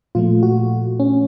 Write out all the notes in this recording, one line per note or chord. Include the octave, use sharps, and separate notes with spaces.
A#2 F3 A3 F4
F#4
C#4